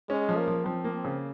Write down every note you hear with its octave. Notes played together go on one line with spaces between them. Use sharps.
G#3 C#4
F3
A#3
F3
F3 C4
A#3
C4
C#3